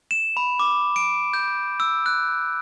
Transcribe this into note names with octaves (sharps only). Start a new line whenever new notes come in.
E7
B5
D6
D7
G6
E6
F#6